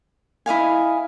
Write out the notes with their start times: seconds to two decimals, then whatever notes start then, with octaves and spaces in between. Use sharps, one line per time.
0.46 E4 D#5 F5 G#5